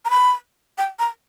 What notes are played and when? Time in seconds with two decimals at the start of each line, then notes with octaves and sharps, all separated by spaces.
0.05 A#5
0.10 B5
0.78 G5
0.99 A#5